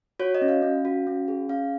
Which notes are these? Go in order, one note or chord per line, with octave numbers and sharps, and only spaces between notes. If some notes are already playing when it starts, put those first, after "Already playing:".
F#4 C#5
D#5
C#4
F5
C#4
F#4
C#4
G#4
C#4 F5